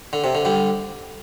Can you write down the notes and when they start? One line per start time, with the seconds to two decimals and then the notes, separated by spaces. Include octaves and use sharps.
0.13 D3
0.24 C3
0.35 D3
0.45 D3 G3